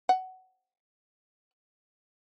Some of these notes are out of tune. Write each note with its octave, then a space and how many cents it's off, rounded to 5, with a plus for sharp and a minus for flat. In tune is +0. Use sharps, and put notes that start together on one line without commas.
F#5 +15